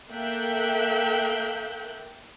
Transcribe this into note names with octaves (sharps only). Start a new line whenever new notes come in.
A#3 A4 E5 G5 F#6 G6